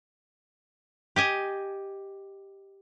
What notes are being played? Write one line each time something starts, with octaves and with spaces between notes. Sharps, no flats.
G4 D#5 G#5